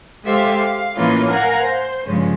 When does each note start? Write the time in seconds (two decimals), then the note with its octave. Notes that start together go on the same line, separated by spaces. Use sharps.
0.23 G#3 G4 A4 C5 E5 F5
0.55 F5
0.94 A2 E3 A#3 C#4 D#4 F4
1.28 A#4 F5 F#5 G#5 A#5
1.62 C5
2.06 G2 C#3 F3 G#3 C#4